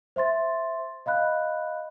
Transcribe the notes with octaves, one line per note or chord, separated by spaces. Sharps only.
C5 E5 C6 A6
D#5 F5 B5 F#6